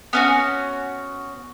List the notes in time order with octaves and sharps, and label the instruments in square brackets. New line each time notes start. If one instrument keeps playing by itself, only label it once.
[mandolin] B3 C#4 F#4